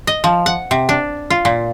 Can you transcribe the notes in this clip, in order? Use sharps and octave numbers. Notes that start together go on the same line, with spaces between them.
D#5
F3
F#5
C3
D4
F4
A#2